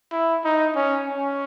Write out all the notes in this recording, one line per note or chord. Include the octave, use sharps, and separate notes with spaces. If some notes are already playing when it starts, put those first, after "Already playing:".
E4
D#4
C#4
C#4